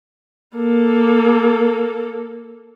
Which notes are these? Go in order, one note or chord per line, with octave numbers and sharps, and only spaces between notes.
A#3 A4